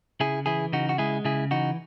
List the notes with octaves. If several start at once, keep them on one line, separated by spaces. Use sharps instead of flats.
C#3 E4 G#4
E3 E4 G#4
C#3 D#4 F#4
F#4
G#3 E4 G#4
C#3 E4 G#4
E3 D#4 F#4